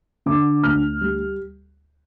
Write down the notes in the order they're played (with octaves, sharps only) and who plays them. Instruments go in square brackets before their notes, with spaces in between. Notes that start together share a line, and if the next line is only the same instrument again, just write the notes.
[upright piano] D3 D6
D2 F6
G3